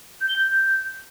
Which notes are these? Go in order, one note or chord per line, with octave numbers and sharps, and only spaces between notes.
G6
G7
G6